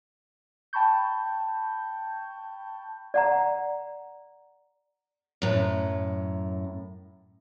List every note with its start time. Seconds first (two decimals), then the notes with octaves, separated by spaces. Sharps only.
0.73 G5 A5 B5 C#6 G6
3.14 D5 F#5 A#5
5.42 F#2 A2